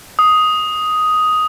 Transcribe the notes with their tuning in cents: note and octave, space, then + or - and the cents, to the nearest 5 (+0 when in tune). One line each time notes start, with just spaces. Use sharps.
D#6 +5